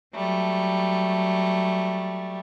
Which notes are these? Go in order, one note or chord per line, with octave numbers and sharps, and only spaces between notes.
F#3 G3 A3